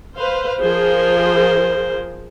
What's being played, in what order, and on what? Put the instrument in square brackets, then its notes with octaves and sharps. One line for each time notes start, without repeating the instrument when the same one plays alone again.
[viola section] B4 C5 F5
[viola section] F3 G#4 A#4 [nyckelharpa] C5